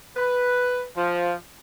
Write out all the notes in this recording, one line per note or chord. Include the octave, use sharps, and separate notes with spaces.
B4
F3